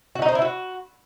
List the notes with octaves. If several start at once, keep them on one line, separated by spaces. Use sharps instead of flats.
F#4
D#4
C5
E4
F#4